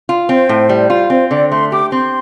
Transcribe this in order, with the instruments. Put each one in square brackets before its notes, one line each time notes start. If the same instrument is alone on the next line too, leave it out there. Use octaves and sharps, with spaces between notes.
[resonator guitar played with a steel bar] F4
[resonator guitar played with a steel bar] C4 [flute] C5
[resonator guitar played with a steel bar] A2
G3
F4
[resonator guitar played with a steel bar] C4 [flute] C5
[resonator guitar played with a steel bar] D3 [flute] D5
[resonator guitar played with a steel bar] A3 [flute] C6
[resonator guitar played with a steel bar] G4 [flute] D6
[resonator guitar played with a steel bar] C4 [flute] C6